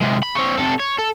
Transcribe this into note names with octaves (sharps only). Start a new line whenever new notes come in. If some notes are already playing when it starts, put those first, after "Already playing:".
C3 G#3
B5
C4 C#5
C3 A4
C#5
A4